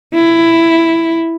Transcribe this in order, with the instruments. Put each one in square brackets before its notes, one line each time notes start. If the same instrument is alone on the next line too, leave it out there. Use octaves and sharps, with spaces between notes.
[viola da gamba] E4